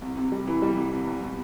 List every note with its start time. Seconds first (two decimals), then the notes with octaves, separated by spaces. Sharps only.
0.02 C2
0.17 C3
0.32 G3
0.47 E3
0.62 G3
0.77 C2
0.92 C2
1.07 C2
1.22 B2